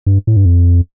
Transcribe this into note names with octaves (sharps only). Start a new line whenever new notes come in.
G2
A2
G2
F2